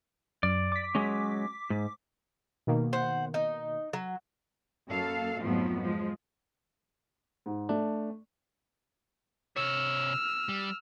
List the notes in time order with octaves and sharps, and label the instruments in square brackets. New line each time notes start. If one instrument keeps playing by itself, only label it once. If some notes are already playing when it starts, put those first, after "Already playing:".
[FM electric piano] F#2 [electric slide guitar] D5
[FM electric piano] D6 B6
[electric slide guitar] F#3 G#3 C#4
G#2
[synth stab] B2 D#3 A#3
[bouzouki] C5 F#5
D#4
F#3
[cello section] F#2 A#3 A4 F5
F2 G#2 F3 F#3 A3 B3
F3 G#3
[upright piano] G#2
[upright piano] A3 [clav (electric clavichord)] D4
[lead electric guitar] C3 C#5 [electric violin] E6 F6
[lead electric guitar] G3